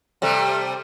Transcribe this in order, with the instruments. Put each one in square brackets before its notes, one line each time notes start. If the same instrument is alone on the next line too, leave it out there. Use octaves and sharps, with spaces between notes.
[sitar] C3 G3 A3